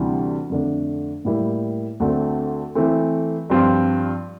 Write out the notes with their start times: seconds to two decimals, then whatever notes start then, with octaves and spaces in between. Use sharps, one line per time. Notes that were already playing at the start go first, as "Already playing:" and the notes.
Already playing: D2 C3 E3 G3 D4
0.50 F2 D3 A3 D4
1.25 A2 G3 A#3 E4 G4
2.00 D2 D3 A3 C4
2.75 E3 A3 C4
3.50 G2 F3 C4 F4